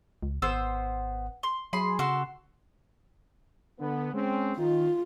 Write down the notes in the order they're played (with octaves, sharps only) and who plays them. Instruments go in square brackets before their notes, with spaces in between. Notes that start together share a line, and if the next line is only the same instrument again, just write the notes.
[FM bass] C#2
[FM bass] G#1 [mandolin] B3 C5 E6
[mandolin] C6
[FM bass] F#3 [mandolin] G#4 B5 C6
[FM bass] C#3 [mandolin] F#4 A4 C6
[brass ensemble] D3 B3
G#3 C4 C#4
[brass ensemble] D#3 [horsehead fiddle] F4